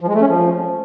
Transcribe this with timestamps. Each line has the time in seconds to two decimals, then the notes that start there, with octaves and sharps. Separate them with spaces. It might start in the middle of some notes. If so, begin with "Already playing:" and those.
0.01 F3
0.08 G#3
0.14 A3
0.21 C#4
0.28 F3